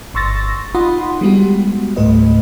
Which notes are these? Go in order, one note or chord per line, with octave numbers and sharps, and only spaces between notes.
G1 C6 C#6 E6 A6 A#6
D#4 F4 F#5 B5 C6 D#6
G3 G#3 B3 F#4 G4
C#2 G#2 A3 B4 D#5